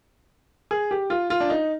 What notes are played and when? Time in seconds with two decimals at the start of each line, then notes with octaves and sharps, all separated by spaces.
0.71 G#4
0.91 G4
1.10 F4
1.30 F4
1.40 D4
1.50 D#4